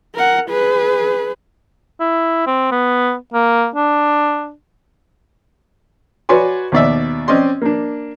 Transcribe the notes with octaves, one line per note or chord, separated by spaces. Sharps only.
A#4 F#5
G#4 B4
E4
C4
B3
A#3
D4
F#4 B4 C#5 D5 G#5 C6
D#2 B2 D5 E5
C4 C#4 D5 D#5 C6
A#3 D4